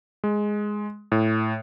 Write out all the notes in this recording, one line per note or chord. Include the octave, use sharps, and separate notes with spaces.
G#3
A2